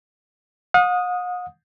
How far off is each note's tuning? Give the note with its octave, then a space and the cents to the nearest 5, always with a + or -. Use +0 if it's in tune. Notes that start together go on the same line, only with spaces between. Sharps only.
F#5 -45 D#6 +0